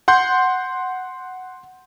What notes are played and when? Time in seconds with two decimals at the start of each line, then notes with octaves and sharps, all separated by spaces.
0.08 F#5 C6 G6